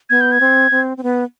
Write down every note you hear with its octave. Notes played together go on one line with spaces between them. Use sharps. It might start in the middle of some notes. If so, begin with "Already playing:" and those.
B3 G#6
G6
G#6
C4
C4
C4
B3